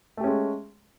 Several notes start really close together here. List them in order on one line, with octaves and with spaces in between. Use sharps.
A3 G4 C#4 G#3